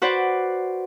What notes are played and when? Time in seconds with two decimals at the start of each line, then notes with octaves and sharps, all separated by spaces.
0.02 F#4 B4 C5 D5 F#5